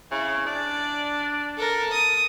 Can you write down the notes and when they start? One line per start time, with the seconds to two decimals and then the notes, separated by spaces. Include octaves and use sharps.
0.11 C#3 E4
0.47 D4 D5
1.57 A4 A#4
1.92 D#6